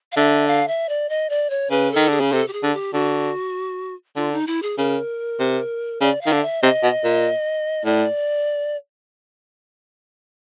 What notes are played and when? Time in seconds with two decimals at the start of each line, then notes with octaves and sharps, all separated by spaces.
0.12 F5
0.17 D3 E5
0.47 F5
0.68 E5
0.89 D5
1.09 D#5
1.30 D5
1.50 C#5
1.71 C#3 B4
1.91 D#3 A4
2.08 D3 G#4
2.20 C#3
2.32 C3 A4
2.48 G4
2.53 G#4
2.63 D3
2.73 G4
2.94 D3 F#4
4.16 D3 F4
4.32 D#4
4.47 E4
4.62 G#4
4.78 C#3 A#4
5.40 C3
6.01 C#3 D5
6.21 F5
6.26 D#3
6.32 D3
6.42 E5
6.63 C3 D#5
6.83 B2
7.04 A#2
7.85 A2 D5